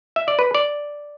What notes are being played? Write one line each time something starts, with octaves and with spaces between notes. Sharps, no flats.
E5
D5
B4
D5